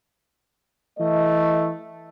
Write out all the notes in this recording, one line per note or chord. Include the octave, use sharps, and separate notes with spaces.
E3 A3 D#5